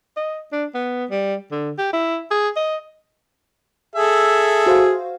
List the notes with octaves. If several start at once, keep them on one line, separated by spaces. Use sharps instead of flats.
D#5
D4
B3
G3
D3
G4
E4
G#4
D#5
G#4 A4 E5
F#4 C5 F5